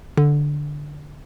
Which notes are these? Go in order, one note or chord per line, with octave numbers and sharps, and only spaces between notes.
D3